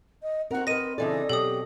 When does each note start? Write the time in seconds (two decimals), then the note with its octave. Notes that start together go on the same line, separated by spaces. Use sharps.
0.22 D#5
0.51 C4 F#4 A#4 F#5
0.67 A#4 B4 D#5 A#6 D#7
0.98 C#3 E3 D4 A4 D5 D#5
1.29 B2 F#3 G4 A4 D#6